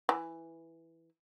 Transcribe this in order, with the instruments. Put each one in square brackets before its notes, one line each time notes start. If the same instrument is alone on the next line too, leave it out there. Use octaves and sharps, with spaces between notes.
[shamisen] E3